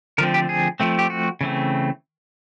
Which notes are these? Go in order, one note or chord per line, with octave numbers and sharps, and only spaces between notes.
D3 F3 A3 C4 A#4
G4
G#4
F3 A3 C4
G4
F#4
C#3 E3 A3 C4